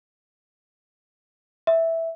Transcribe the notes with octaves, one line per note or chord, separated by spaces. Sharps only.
E5